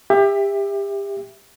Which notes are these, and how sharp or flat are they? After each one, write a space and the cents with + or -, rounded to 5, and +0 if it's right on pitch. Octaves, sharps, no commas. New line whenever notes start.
G4 +30 E5 +0